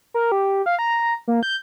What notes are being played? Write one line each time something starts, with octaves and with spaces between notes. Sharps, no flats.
A#4
G4
F5
A#5
A#3
G6